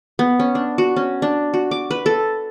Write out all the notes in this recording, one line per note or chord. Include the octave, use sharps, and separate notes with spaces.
B3
C#4
D4
F#4
C#4
D4
F#4
D6
B4
A4